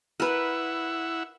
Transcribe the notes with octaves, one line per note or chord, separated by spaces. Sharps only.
E4 A#4 B4 F#5 E6